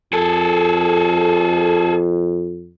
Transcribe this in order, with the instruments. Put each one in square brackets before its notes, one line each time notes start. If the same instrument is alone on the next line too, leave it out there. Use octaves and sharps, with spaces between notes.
[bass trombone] F2 [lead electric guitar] G#4 A4